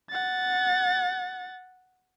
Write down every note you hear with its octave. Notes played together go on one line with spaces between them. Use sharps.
F#5 A6